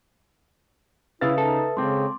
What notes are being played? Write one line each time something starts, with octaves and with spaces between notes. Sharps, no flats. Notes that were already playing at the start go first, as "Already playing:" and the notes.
C#3 E4 B4 E5 F5 D#6 A6
D#4 A4
C#3 G#3 C4 C6 D6